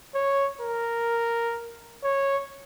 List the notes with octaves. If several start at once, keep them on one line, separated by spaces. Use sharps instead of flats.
C#5
A#4
C#5